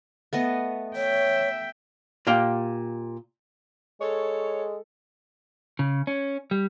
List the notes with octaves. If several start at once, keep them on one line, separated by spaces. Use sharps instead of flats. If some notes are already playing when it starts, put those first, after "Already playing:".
A3 B3 D#5
C#5 E5 G5
A#2 G4 F5 G5
G#3 A4 C#5
C#3
C#4
G3